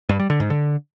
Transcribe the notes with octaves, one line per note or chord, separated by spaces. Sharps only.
G2
G3
D3
G#2
D3